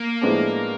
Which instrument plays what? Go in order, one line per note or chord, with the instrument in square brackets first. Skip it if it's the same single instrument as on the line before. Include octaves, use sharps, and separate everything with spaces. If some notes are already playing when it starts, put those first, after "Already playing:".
Already playing: [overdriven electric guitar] A#3
[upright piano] A2 F3 G#3 B3 D4